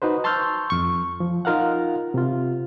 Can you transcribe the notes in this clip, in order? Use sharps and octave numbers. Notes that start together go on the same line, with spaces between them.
D#4 F#4 B4 C5
A5 C6 C#6 E6 F6 G6
F2 C#6
F3
D#4 F4 A#4 F5 F#5
C3 F4